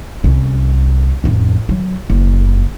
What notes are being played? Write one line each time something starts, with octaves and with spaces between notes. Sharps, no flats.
C2 C#4
A1 F2
F#3
F#1